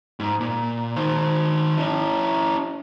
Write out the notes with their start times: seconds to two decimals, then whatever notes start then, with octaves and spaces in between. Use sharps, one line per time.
0.20 G#2
0.41 A#2
0.96 D#3 C5
1.77 C#4 E4